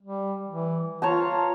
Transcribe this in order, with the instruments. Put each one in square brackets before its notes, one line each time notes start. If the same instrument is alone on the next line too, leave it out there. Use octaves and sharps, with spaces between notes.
[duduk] G3
E3
[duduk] F4 [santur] C#5 A5 A#5